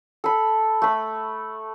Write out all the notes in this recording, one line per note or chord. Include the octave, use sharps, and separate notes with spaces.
A4 B5
A3 B5